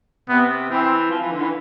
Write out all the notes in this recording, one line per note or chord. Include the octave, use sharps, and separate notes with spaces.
C3 B3
E3 C4
F3
E3
D3
E3